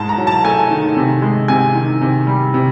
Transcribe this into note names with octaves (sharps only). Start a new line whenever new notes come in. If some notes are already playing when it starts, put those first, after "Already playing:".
Already playing: G#2 G#3 A5
A#5
F#3
A5
A3 G#5
D#3
C3
G#3
C3 G#5
D#3
C3
G3
C3